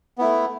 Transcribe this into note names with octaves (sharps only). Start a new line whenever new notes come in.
A3 B3 E4